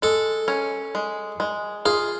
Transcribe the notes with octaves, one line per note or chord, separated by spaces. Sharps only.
G#3 A4
C#4
G#3
G#3
F4 G#4